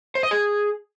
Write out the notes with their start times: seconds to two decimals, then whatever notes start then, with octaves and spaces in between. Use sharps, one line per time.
0.15 C5
0.23 D#5
0.31 G#4